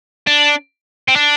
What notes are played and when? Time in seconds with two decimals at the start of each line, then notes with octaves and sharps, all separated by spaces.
0.27 D4
1.08 C4
1.16 D4